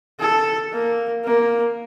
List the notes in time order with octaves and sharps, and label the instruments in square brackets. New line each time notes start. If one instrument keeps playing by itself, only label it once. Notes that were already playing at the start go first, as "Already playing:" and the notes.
[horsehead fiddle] A4
A#3
A#3